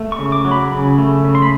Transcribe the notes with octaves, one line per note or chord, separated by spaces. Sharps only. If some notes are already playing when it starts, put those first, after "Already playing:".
Already playing: A3
C#6
C#3
D6
F#3
B5
C#3
A3
C#3
C6
B5